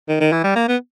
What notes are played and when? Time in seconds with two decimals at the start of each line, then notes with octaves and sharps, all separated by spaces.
0.08 D#3
0.20 D#3
0.32 E3
0.44 G3
0.56 A#3
0.68 B3